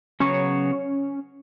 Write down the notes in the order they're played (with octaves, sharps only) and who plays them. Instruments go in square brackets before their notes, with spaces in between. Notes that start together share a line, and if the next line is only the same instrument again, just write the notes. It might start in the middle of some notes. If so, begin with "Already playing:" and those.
[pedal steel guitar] C#3 F#3 B3 F#4 C#5 [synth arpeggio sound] C#4